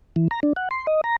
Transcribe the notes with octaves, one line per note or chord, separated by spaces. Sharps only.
E3
A#5
D4
F#5
C6
D#5
A#5